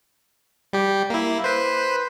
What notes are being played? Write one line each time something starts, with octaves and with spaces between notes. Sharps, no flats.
G3 G4
A#3 E4
B4 C5